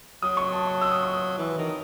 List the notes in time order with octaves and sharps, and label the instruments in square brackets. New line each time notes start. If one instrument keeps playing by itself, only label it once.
[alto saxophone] F#3 [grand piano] D#6
[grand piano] C#6
A5
C#6
E6
D#6
C#6
D#6
[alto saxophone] E3
D#3